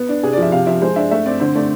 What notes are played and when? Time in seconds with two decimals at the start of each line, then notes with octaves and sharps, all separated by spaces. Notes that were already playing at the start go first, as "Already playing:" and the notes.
Already playing: B3
0.09 D4
0.23 C3 G#4
0.33 F3 D5
0.42 E5
0.52 C3 F5
0.66 F3 E5
0.82 G#3 C5
0.96 D4 E5
1.11 A3 E5
1.26 C4 D5
1.40 D3 C5
1.55 A3 D5